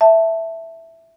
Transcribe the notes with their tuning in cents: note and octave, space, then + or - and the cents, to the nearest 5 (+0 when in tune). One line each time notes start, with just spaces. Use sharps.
E5 +0 A5 +0